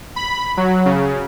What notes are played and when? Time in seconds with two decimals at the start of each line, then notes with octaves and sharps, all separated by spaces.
0.16 B5
0.57 F#3
0.86 C#3